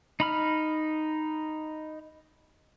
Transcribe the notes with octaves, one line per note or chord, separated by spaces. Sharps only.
D#4 B5 F6